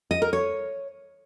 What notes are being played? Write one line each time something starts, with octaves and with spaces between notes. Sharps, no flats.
D#5
A#4
C#5